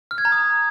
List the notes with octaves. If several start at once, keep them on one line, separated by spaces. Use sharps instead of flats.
F6
G#6
A#5
D#6